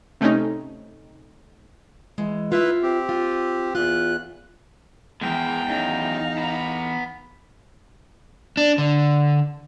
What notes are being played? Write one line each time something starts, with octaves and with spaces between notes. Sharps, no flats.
C3 A3 C4 C#4 D#4
E3 G#3
E4 F4 B4 E5
C4 G4
F4
E2 F4 F#6
E2 E3 G#3 A#4 G5
F#2 D#3 D#4 F5
B3 A#5 B5
D4
D3